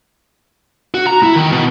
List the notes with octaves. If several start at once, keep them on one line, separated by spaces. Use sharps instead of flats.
F#4
A#5
E4
D#3
B2